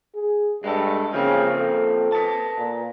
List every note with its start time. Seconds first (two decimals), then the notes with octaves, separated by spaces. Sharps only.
0.15 G#4
0.64 G2 G#3 A4
1.14 C#3 F3 A#3 C4
1.55 A4
2.12 B4 A5
2.58 A#2